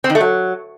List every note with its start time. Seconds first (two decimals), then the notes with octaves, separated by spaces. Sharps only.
0.04 C4
0.10 D#3
0.15 A3
0.20 F#3